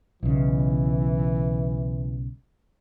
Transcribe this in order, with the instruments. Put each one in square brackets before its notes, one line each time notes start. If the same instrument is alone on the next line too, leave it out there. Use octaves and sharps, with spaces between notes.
[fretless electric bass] B1 C#3 [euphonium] E3